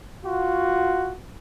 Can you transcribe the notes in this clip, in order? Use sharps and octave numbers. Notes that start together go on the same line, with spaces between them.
F4 F#4